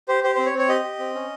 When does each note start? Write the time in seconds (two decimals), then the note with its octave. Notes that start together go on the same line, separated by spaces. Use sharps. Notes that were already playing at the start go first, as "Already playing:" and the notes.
0.08 G4 C5
0.23 G4 C5
0.35 C4 C5
0.46 C#5
0.53 C4
0.58 C#5
0.69 G4 D#5
0.83 G4
0.99 C4
1.15 C#4